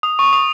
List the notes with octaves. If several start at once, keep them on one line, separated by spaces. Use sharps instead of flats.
D#6
C#6
D#6